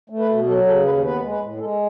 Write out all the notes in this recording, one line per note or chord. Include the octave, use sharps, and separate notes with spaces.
A3
B4
B2
F#3 A4
C#3 A4
D#2 B4
B3 B4
G#3
B4
A2
G#3 A4